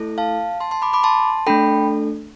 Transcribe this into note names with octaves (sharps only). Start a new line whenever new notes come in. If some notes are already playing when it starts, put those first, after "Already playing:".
Already playing: A3 E4 A4
F5 A5
A5 C6
A5 C6
B5 D6
B5 D6
A5 C6
A3 D4 A4 G5 B5